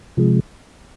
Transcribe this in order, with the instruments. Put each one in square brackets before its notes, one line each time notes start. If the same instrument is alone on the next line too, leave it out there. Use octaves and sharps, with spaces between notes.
[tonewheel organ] C3 F3 G#3